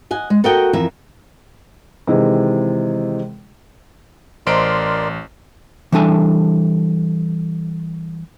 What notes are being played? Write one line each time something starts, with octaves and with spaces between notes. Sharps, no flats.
D#5 F#5 G#5
G#3
F#4 A4 A#4 D#5 F#5 G5
F2 E3 A#4 E5
C3 D#3 E3 G#3 G#4 C5
A1 A#4 C5 D5 D#5 A#5 C6 D7
E3 G3 D4 A4 G#5